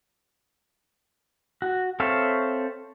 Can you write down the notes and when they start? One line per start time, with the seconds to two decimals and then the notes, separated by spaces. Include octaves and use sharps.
1.62 F#4
2.00 C4 A4 C#5 E5 F5